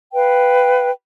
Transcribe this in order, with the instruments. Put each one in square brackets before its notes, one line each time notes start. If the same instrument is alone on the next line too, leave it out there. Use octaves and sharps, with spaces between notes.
[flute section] B4 F5 G5